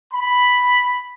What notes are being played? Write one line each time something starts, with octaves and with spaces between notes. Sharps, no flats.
B5